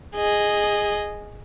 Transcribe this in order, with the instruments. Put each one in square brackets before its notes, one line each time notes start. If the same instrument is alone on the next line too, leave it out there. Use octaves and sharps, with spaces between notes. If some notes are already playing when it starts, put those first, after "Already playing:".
[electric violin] G#4 D#5